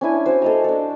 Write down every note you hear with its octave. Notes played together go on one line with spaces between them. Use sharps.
C#4 D4 E4 G#5
F#4 C5
A4 D#5 A#5
D4 A4